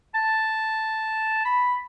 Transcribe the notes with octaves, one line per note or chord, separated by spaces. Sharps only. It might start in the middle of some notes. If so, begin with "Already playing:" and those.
A5
B5